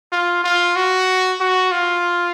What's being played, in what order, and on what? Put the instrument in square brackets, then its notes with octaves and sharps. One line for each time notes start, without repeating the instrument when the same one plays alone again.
[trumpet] F4
F4
F#4
F#4
F4